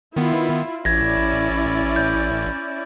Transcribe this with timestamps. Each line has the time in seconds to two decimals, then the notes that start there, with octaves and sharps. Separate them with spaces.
0.16 D#3 B3 E4 F4
0.85 A1 C#4 E4 D5 G#6 A#6
1.96 G6